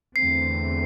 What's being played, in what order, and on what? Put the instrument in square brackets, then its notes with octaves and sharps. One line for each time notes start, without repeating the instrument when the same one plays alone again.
[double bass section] E2 D3 A3 C4 [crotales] C7